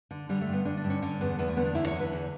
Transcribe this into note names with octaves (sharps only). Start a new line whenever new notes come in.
D3
D3 G3
A3
G2
B3
D3 D4
D4
G2
C#4
D3 C#4
E2 B3
E2 B3
A3
D3 B3
D4
E2 E4
C#5
D3
B4
E2